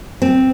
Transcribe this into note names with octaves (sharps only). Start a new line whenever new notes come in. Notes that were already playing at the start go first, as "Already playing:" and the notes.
C4